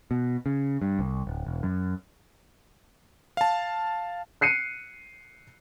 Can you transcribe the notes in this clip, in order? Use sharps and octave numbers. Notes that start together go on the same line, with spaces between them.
B2
C#3
G2
C2
D1
E1
F#2
F5 A5
F#6 C7 C#7 D#7